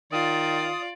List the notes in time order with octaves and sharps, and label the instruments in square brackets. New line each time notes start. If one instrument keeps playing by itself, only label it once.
[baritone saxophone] D#3 [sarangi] F4 [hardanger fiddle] D5 [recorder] D#6